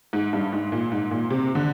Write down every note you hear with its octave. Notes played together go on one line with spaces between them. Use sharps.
G#2
G2
G#2
A#2
G#2
A#2
C3
D3